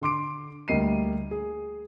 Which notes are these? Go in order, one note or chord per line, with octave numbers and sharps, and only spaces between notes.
D3 C6 D6 D7
D2 G3 A#3 D#5 C7 D#7
G#4